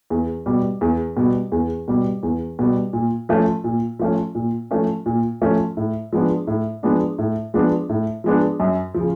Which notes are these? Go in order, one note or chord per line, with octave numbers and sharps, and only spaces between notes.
E2
B2 G3
E2
B2 G3
E2
B2 G3
E2
B2 G3
A#2
F3 A3 C#4
A#2
F3 A3 C#4
A#2
F3 A3 C#4
A#2
F3 A3 C#4
A2
F3 G#3 B3 D4
A2
F3 G#3 B3 D4
A2
F3 G#3 B3 D4
A2
F3 G#3 B3 D4
F#2
F3
C#3